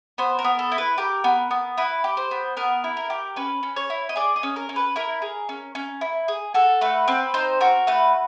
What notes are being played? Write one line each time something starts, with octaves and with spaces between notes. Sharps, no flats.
B3 C5
A#4
B3
A4
E4
B4
G4 A#4
B3
B3
E4 B4
G4
C5
B3
B3 A#4
E4
A#4
G4
C#4 B4
C#4
C#5
E4
D#5
G#4 D5
D#5
C#4
A#4
C#4
B4
E4 A#4
G#4
C#4
C#4
E4
G#4
F#4 A4
A3 B4
C4 B4
D#4 C5
F#4 A#4
A3 B4